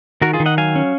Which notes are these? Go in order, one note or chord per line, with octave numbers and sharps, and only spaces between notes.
D#3 F#4 A#4
F4 G#4
D#3
D#5 F#5
F#3 F5 G#5
C#4